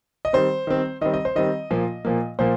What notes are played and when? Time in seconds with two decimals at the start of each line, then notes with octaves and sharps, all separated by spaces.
0.25 D#5
0.33 D#3 G3 C4 C5
0.67 D#3 G3 C4
1.01 D#3 G3 C4 D#5
1.14 D#5
1.25 C5
1.36 D#3 G3 C4 D#5
1.71 A#2 F3 A#3
2.05 A#2 F3 A#3
2.39 A#2 F3 A#3 C5